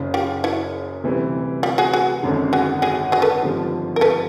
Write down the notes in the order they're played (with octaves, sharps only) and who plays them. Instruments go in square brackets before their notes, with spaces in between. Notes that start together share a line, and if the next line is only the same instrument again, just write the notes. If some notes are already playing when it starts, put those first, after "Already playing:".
Already playing: [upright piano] F#1 F#2 C#3
[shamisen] F4 G4
E4 F#4
[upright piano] D2 C3 E3 G3
[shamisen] F4 G4
F#4 G#4
F#4 G#4
[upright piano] G#1 F#2 D3
[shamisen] F#4 G#4
F#4 G#4
F#4 G#4
A4 B4
[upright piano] G#1 G2 D3 F3
[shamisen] A#4
A4 B4